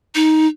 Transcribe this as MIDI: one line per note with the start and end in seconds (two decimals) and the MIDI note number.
0.15 0.47 63